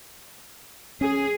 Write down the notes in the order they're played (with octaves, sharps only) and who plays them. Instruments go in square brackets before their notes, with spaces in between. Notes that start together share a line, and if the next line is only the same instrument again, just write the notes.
[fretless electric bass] C#4 [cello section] G#4